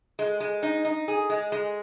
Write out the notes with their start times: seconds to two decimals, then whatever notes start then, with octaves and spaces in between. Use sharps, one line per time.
0.19 G#3
0.40 G#3
0.63 D#4
0.85 D#4
1.08 G#4
1.30 G#3
1.52 G#3